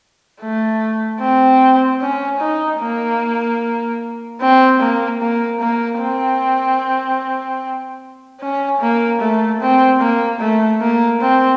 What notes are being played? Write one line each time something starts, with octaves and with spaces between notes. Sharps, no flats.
A3
C4
C#4
D#4
A#3
C4
A#3
A#3
A#3
C4
C#4
A#3
A3
C4
A#3
A3
A#3
C4